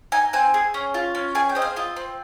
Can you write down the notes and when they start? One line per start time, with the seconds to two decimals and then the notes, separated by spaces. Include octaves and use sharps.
0.12 D#4 G#5
0.33 C4 G#5
0.54 G#4
0.74 C#4
0.94 F4
1.15 C#4
1.35 G#4 G#5
1.49 G5
1.55 C4 D#5
1.62 F5
1.76 F4 D#5
1.96 C4